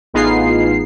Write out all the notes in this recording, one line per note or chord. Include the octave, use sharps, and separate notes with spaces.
A1 B3 D#4 F4 G#4 C7